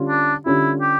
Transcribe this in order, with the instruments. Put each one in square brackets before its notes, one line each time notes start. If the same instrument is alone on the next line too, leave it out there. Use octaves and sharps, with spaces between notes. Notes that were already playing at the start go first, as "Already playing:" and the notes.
Already playing: [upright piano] D3 G3 C#4 F4
[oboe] D4
[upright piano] D3 G3 C#4 F4 [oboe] E4
[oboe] G4